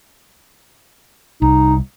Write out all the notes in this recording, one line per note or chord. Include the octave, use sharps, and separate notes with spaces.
C2 D#4